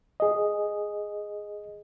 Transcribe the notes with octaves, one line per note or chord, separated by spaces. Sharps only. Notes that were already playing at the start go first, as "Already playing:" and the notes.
G#4 D#5